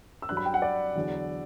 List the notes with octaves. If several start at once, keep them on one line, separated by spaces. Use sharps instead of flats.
E6
G2 F#3 F#6
B5
G5
F#5
D5
E2 D3 F#3